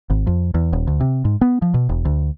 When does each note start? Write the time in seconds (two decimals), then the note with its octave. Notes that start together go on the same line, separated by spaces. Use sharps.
0.10 G#1
0.27 F2
0.54 E2
0.73 D#1
0.87 D2
1.01 C3
1.25 G#2
1.41 B3
1.62 F3
1.74 B2
1.89 E1
2.05 D2